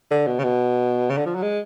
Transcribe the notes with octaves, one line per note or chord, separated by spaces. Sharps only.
D3
B2
C#3
B2
C#3
D3
F3
F#3
G#3